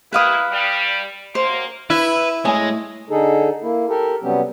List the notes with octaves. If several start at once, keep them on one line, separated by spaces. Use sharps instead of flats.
G3 A#3 E4 B4 F5 D#6
G3
F#2 A#3 C5
E4 B4
A2 G#3 C#5 G#5
D3 D#4 G#4 A4
A#3 E4
G4 A4 A#4
C3 F#3 G3 B3 C#4 G4